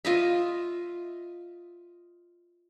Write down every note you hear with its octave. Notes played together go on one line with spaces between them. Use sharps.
F4 D#5 E5